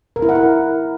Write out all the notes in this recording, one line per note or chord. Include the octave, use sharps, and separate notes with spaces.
A#4
E4
F#5
A#4